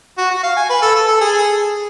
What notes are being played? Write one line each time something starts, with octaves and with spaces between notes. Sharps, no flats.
F#4
F#4
F5
G#5
B4
A4
A4
A4
G#4